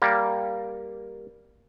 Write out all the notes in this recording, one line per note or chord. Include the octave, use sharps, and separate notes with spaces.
G3 A#3